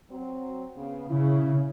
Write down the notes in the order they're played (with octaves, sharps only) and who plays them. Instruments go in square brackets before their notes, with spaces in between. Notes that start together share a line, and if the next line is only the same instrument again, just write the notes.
[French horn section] F#3 C4
C#3 B3
[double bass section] C#3 [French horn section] E4